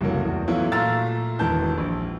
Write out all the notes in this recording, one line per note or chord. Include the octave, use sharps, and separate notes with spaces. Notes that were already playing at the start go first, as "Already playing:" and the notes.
F#1 C2 A2 F#3 A#3
E2
A2 E3 F#3 B3 E4 F4
A#2 A3 F5 A#5 E6 A6
E1 G#2 D#3 E3 A5 G6
A#1